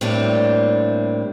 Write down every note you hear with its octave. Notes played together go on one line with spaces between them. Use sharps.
A2 G3 A#3 C4 D4 E4